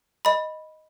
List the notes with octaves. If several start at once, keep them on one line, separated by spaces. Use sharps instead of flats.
D#5 B5